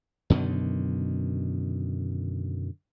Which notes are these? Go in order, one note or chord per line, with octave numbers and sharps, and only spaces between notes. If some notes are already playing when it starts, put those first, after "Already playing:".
F#2 B2 D3 D#3